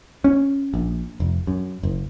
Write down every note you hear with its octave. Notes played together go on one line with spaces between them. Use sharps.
C#4
A#1
F1
F#2
F#1